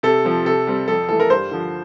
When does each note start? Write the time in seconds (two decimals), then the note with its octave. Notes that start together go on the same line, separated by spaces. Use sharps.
0.03 C3 A4
0.25 F3 C4
0.45 C3 A4
0.67 G3 C4
0.88 F2 A4
1.08 E3 A3 A4
1.20 A#4
1.30 G2 C5
1.51 D3 F3